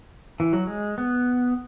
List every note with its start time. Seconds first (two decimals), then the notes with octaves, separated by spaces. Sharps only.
0.40 E3
0.53 F#3
0.67 G#3
0.98 B3